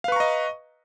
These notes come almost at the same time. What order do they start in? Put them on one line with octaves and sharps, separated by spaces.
F5 B4 C#6 A#5 D#5